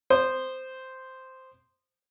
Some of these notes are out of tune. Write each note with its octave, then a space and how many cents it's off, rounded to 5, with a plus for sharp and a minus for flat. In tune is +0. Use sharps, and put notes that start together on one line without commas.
C5 -5 D#6 -25